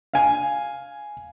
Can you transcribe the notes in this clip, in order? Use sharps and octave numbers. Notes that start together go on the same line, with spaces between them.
F5 G#5